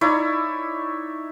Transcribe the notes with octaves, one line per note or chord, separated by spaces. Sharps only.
D#4 E4 C#5 D5